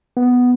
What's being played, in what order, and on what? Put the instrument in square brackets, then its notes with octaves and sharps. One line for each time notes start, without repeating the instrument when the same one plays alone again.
[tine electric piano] B3